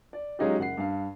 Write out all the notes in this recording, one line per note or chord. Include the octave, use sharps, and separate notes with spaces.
D5
F#3 G#3 C#4 D#4 F4 G4
F#1 F#5 C7
G2 F5